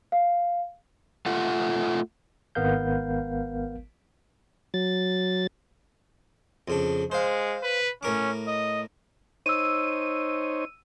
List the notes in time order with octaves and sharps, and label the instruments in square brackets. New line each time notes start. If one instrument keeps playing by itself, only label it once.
[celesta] F5
[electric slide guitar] A3 F4 A4 F#5
[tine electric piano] G#1 B3 A#4 F5 G6
[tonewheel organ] F#3 A6
[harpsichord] F2 C#3 D4
[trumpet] G#3 [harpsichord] C5 F5
[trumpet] B4
[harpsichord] A2 A#4 D6 [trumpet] C#4
[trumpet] D#5
[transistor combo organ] D#4 C5 C#5 [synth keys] E6 D#7